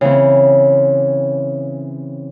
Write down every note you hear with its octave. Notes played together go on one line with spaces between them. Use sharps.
C#3 E3 C4